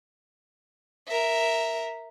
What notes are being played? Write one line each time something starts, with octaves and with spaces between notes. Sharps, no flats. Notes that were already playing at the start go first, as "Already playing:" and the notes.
A#4 E5